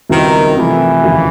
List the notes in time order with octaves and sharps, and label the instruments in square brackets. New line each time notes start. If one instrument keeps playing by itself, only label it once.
[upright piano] C#2 B2 G3 C4 E4 [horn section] D#3
[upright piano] C3 F3 A3 [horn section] E3
[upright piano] F1 D#2 C#3